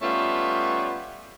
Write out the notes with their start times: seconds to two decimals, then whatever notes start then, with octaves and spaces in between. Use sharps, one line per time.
0.02 G3 A3 B3 C#4 F4